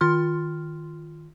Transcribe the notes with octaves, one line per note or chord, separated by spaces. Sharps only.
D#3 F4 C6 F6